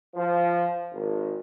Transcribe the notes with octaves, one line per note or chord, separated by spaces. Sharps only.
F3
G#1